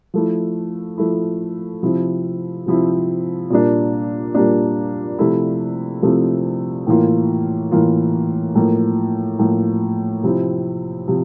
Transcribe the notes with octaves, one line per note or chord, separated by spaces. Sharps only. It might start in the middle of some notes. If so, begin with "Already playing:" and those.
F3 A3 E4
F3 A3 E4
C3 F3 C4 E4
C3 F3 C4 E4
A#2 G3 A#3 D4
A#2 G3 A#3 D4
C3 F3 A3 C4 E4
C3 F3 A3 C4 E4
A2 E3 A#3 F4
A2 E3 A#3 F4
A2 F3 A#3
A2 F3 A#3
C3 F3 C4 E4
C3 F3